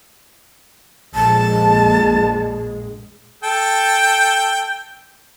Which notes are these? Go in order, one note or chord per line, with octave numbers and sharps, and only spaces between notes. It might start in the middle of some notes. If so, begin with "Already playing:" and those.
A#1 F2 G#3 A5
A4 G5